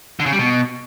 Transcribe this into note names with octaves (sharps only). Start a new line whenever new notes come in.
D3
C#3
G3
B2